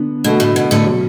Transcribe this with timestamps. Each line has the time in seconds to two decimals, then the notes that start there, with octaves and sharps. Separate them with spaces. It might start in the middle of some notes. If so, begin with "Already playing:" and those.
Already playing: D3 B3 D4
0.24 B2 D3 A3 F#4 A4
0.40 A2
0.56 B2
0.71 A2 D3
0.86 B2 F#3